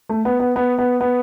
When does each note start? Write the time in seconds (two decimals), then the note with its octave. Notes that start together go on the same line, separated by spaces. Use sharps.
0.09 A3
0.25 B3
0.40 B3
0.56 B3
0.79 B3
1.01 B3